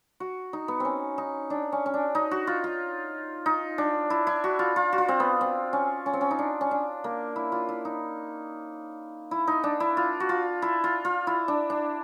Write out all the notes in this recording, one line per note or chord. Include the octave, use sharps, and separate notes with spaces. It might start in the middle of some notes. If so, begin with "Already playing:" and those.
F#4
D#4
B3
C4 C#4
D#4
D4
C#4
C#4
D4
D#4
F#4
F4
F4
D#4
D4
E4
E4
F#4
F4
F4
F#4
F4
C4
B3
C4
C#4
C#4
C4
C#4
D#4
D4
C#4
D4
A#3
E4
F4
E4
D#4
E4
D#4
D4
E4
F4
F#4
F4
E4
F4
F4
E4
D4
D4